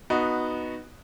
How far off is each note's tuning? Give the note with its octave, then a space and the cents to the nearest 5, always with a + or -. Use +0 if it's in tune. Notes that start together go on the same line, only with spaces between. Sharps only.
B3 +0 D#4 +0 F#4 -10